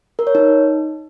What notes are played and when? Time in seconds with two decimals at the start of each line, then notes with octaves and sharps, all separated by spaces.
0.19 A#4
0.27 C#5
0.35 D#4